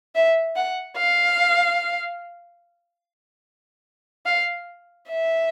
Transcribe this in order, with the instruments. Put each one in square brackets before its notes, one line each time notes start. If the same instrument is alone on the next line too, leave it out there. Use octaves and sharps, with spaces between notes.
[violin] E5
F#5
F5
F5
E5